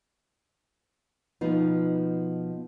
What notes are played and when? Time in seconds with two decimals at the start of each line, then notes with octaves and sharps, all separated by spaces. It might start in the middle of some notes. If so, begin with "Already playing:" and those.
1.41 B2 F3 B3 D#4 F4